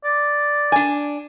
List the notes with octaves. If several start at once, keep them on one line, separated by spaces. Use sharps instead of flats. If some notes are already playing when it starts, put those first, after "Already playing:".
D5
D4 G#5